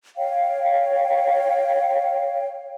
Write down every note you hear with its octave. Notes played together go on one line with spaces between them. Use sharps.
C#5 F5 G5